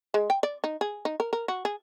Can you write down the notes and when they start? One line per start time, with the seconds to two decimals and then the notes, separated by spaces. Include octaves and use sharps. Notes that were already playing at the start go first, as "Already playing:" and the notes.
0.14 G#3
0.30 G5
0.43 D5
0.64 D#4
0.81 G#4
1.05 D#4
1.20 A#4
1.33 A#4
1.48 F#4
1.65 G#4